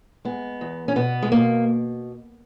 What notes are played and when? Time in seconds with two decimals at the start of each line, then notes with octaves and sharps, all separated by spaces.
0.25 G#3 B3
0.61 E2
0.88 C#4
0.96 B2 B3
1.23 G#3
1.32 B2 A#3